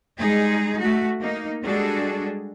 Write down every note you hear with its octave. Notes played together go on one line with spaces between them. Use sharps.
G3 G#3 D#4 G#4
A3 F#4
A#3 D#4
G3 G#3 D4 F#4 G#4 A4